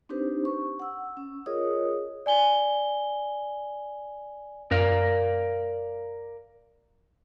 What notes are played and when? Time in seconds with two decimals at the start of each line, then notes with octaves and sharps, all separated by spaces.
0.09 C4 D4 D#4 G4 B4 C5
0.45 C#6
0.79 F#5 E6
1.17 C#4
1.46 F4 G#4 A#4 C#5 D#5 D#6
2.26 D5 G#5 G7
4.71 F#2 A#4 D5 F5 F6